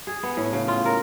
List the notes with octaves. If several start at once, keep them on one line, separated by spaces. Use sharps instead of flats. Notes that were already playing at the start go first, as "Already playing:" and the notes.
G#4
B3
A2
C#3
F4
A#4